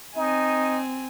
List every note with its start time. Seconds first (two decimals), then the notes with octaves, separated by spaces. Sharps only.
0.16 C4 D#4 G#5